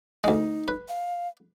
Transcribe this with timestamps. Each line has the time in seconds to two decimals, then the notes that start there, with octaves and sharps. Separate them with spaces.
0.24 D2 G#3 D#4
0.68 B4
0.88 F5